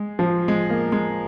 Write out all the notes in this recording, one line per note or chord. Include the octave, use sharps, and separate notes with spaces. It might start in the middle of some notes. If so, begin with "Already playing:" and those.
Already playing: G#3
F3
G#3
A#3
G#3